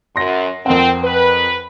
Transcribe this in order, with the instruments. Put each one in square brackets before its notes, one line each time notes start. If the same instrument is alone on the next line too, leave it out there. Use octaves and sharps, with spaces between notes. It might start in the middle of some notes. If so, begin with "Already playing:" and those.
[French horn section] F#2 [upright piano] C6 A#6
[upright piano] F2 A#4 F#5 [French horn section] C4
[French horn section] B4